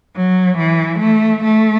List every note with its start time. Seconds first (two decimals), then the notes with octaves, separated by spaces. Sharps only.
0.14 F#3
0.57 E3
0.99 A3
1.42 A3